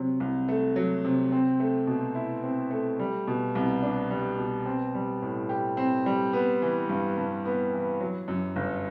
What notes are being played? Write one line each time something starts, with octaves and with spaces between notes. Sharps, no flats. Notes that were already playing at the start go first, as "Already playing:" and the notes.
Already playing: C3 F#3
C2
A3
F#3
C3
C4
A3
B2
E4
C4
A3
G3
B2
C2
D4
G3
B2
C4
G3
A2
G4
C4
G3
B3
E3
G2
G2
B3
E3
F#3
F#2
G1